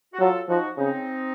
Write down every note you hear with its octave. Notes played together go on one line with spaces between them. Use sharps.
F#4
F#3 F4 A4
F3 D#4 F#4
C#3 C4 D#4